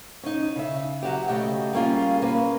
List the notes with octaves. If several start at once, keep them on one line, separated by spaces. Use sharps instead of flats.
C#4 D#4
C#3 E5
F#3 F#4 G4
C#3 A3 G4 D#5 G5
G3 A#3 C#4 F4 G#4
A#3 C#4 B4